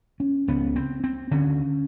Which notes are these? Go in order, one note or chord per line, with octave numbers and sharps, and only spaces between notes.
C#4
C#2 C#3 B3
C4
C4
D2 D3 C#4